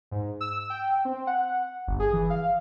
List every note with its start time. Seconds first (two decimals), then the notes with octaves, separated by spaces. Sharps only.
0.11 G#2
0.41 E6
0.70 G5
1.05 C4
1.27 F#5
1.88 G1
2.00 G#4
2.13 E3
2.30 F5